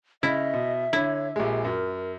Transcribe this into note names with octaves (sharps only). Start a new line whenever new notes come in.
C#3 E4 D#5 E5
B2
D3 E4 C#5
A#1 G#3 G4
F#2 A#4